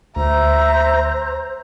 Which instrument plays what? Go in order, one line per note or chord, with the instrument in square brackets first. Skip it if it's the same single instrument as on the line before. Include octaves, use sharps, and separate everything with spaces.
[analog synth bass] D2 [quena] C5 [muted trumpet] E5 [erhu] A#5